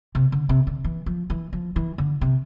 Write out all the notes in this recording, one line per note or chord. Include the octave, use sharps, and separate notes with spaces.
C3
D3
C3
D3
E3
F3
E3
F3
E3
D3
C3